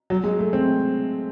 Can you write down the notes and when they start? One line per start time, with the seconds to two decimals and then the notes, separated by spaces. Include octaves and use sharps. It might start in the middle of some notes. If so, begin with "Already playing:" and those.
0.10 F#3
0.24 G#3
0.39 A3
0.53 C4